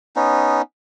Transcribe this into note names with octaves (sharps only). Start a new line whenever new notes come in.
B3 C#4 D#4